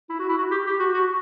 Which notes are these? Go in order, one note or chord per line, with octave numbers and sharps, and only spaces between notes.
E4
F#4
E4
F#4
G4
G4
F#4
F#4